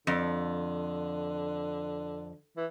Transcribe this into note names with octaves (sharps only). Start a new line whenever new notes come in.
F2 D3
E3